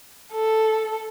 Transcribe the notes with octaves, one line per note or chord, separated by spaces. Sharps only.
A4